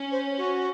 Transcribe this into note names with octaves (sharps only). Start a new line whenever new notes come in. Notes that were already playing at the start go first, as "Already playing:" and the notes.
Already playing: C#4
C5
F#4